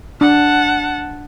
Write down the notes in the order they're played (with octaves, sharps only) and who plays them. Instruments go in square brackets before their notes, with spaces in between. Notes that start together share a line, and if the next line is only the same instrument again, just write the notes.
[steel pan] D4 [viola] F#5 A5